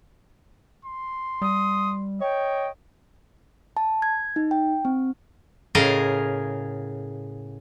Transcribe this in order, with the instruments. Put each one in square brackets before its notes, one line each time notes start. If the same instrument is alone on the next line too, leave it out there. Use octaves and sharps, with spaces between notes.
[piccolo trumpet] C6
[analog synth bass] G3 [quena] D#6
[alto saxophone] C#5 [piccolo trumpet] D#5 [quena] G5
[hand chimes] A5
G#6
D#4
G5
C4
[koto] A2 C#3 G#4 A#4 D#5 F5